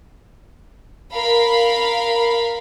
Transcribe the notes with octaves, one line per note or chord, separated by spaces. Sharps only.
A#4 F5 B5